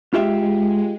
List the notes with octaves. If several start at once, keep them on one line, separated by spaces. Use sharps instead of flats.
G#3 F4 G4 E5